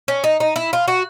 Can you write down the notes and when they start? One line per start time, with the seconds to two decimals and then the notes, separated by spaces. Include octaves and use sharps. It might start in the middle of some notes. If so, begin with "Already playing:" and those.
0.08 C#4
0.24 D#4
0.40 D#4
0.56 E4
0.73 F4
0.88 F#4